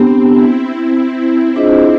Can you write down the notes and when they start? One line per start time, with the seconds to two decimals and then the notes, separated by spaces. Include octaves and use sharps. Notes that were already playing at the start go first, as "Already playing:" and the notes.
Already playing: B3 C4 D4 G4
0.26 E4
1.56 D4 F4 G#4 C5 D#5